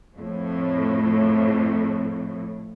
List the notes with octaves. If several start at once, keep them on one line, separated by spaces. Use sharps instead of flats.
F2 A2